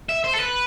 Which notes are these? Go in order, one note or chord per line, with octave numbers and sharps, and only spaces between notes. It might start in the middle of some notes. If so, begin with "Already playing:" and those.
E5
C5
A4
B4